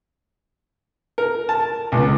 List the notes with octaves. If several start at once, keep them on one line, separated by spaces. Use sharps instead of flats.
A#4
A5
C#2